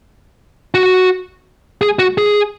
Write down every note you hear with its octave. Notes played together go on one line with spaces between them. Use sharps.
F#4
G#4
F#4
G#4